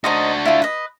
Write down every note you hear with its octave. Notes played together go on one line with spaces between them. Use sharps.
D4 D#4 F#4 C5 D#5
E4 F4
B4 D#5